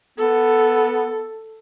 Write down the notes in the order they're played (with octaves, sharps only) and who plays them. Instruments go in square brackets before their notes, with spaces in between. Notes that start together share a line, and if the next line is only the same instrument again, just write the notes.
[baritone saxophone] B3 [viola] A4